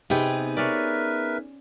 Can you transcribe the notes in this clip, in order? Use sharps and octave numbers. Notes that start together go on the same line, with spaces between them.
C3 B3 D#4 G#4 G5
C#4 A#4 B4 D5 E5